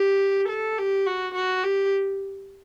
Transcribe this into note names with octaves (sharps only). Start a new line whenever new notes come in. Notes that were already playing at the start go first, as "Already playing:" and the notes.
Already playing: G4
A4
G4
F#4
F#4
G4